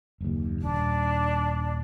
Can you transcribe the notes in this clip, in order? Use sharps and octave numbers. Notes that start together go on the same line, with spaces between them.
F#1 D#2
D#1 D4